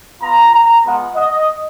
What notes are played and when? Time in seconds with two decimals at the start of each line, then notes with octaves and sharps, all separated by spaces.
0.21 B3 F4 A#5
0.53 A#5
0.84 G#3 B3 F4 F#5
1.16 D#5